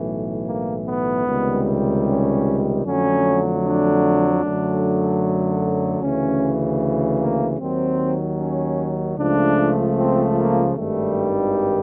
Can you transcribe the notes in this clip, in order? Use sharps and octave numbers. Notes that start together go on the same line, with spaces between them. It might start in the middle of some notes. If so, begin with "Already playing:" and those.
Already playing: B1 A2 E3
A#3
B3
C#2 C3 D#3 G3
C#4
F2 D3 F#3 A3 C#4
D4
F#2 D3 F#3 A3
D2 C#3 E3 C#4
A#3
D#2 D#3 F#3 C4
C#4
C#2 C#3 F3 A3 D4
C4
A#3
G#1 G2 D#3 G3 A3